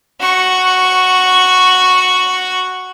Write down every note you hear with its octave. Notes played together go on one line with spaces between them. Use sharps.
F#4 C#6